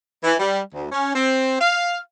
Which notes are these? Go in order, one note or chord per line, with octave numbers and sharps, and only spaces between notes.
E3
G3
D2
C#4
C4
F5